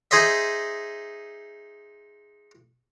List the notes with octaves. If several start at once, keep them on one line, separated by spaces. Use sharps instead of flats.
D#4 G#4 C5 D#5 E5